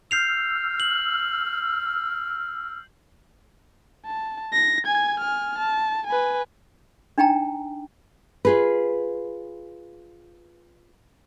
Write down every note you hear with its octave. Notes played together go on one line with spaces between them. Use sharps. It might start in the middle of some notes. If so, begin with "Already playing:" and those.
E6 F6 G6 C7 F7
F#7
A5
A#6
G#5 G#6
G#5 F6
A5
B4 G#5
D4 D#4 G5 G#5 A#5
F4 G#4 B4